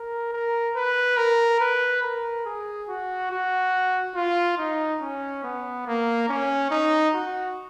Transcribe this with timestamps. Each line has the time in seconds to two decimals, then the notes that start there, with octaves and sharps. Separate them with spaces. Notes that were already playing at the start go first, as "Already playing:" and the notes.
Already playing: A#4
0.32 A#4
0.76 B4
1.17 A#4
1.60 B4
2.03 A#4
2.45 G#4
2.88 F#4
3.31 F#4
4.15 F4
4.58 D#4
5.01 C#4
5.43 B3
5.86 A#3
6.29 C#4
6.71 D#4
7.14 F#4